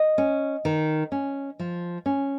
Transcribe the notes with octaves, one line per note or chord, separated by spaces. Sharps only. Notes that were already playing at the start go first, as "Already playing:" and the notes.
Already playing: D#5
C#4
D#3
C#4
F3
C#4